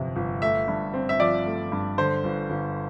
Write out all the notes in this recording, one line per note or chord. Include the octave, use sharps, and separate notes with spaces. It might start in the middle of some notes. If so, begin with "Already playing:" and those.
Already playing: G1 F2 C3
G1
A3 E5
G2
C4
E5
F3 D5
A3
G2
D3 C5
G1
G1